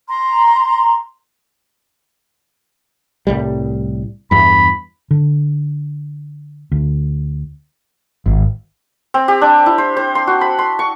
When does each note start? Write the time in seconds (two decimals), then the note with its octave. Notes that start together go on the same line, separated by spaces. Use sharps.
0.09 A#5 C6
3.27 C2 A2 G3
4.31 E2 G2 B5
5.11 D3
6.72 D2
8.26 G#1
9.14 C4
9.28 G4
9.41 D4
9.66 E4
9.78 C5
9.97 C5
10.15 C6
10.27 F#4
10.41 B5
10.59 C6
10.79 C#6